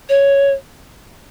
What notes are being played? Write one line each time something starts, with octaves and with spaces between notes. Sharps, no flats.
C#5